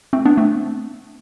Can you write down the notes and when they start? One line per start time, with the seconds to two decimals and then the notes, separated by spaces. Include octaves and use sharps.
0.13 A3 C4
0.25 B3 D4
0.37 A3 C4